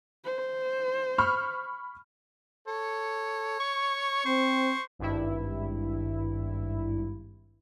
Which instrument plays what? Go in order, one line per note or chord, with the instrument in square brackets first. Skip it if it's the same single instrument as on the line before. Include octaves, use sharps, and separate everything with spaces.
[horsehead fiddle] C5
[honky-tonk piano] B5 C#6 F6
[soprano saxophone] A4 [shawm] C#5
[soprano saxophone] C#6
[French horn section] C4 [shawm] C5
[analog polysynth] G#1 G2 E4